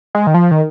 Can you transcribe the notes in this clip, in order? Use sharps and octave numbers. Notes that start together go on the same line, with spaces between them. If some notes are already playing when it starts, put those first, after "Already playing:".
G#3
D#3
F3
D#3